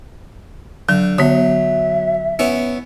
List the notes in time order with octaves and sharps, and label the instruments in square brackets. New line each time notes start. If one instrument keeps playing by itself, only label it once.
[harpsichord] D3 [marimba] F#3
[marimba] D3 B3 [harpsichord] F#3 [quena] E5
[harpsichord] B3 C#4 E4